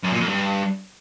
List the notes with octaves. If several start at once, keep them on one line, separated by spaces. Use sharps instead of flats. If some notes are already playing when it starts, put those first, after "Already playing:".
F#2
A#2
F2
G2